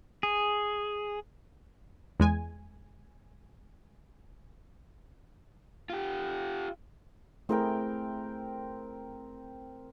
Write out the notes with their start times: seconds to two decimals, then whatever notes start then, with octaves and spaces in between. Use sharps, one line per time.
0.23 G#4
2.20 E2 G#3 G#5
5.90 F4 G4
7.49 A3 C4 E4 G#4 A#4 G5